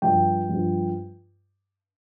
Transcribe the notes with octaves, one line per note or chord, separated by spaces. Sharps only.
G2 F3 G5
G2 F3